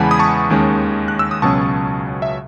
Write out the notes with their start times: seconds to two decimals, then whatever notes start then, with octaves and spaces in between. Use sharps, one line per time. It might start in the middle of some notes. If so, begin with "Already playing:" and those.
Already playing: E2 C#3 E3 G#3 F#5 G#5 A5 B5
0.11 D#6
0.19 A5 C#6
0.50 D#2 D#3 G#3 C#4
1.08 F#6
1.19 E6
1.31 D#6
1.42 C#2 B2 F#3 C#4 A5 C#6
2.22 E5